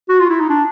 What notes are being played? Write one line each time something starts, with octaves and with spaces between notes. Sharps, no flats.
F#4
F4
E4
D#4
D4